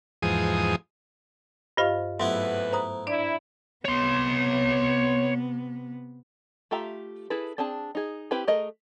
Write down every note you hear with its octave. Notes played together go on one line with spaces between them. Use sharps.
E2 G#2 F3 G#4 D#6
G2 F4 G4 C5 D#5 F5
E2 G#2 C3 F#3 A3 B3 E4 B4
C5 A#5 D#6
D4 E4 D5
C3 B3 C#5 C6
A3 F4 G4 E5 A#5
E4 G#4 A4 B4
C4 D4 G#4 A5
D#4 G#4
C4 E4 G4 B4 G5
A3 G#4 A#4 D#5